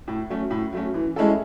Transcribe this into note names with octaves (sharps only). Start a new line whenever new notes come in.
A2
F#3 A3 C#4
A2
F#3 A3 C#4
E3
G#3 C#4 E4 A4